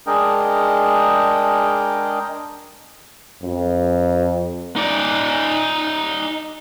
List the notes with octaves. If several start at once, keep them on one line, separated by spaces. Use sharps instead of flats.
G#3 D4 G#4 A#4 D#5 G5
F2
D#4 D5